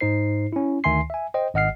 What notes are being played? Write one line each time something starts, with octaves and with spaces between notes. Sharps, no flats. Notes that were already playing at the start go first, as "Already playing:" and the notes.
G#2 D#4 C5 C7
C#4 E4
D2 D#3 E5 G#5 C6 C7
E5 G#5
C5 D#5 G5
G#1 D#5 F#5 F6 C7